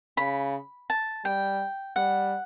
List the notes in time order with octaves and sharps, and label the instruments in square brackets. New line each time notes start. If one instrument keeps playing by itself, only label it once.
[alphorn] C#3 [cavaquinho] B5
[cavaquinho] A5
[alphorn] G3 [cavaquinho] G5
[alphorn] G3 [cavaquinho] F#5